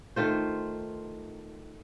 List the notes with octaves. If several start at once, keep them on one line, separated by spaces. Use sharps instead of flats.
D#3 A3 F4 C5